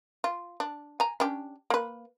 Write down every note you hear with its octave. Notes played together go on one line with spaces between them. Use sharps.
F4
D4
G#5 A#5
C#4 D4 G4
A#3 B4